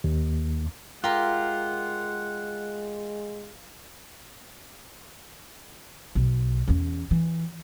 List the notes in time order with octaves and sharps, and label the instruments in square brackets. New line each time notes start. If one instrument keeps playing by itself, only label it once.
[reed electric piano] D#2
[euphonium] G#3 [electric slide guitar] F4 [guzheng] G4 A#4 [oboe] F#5
[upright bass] B1
E2 C#4
E3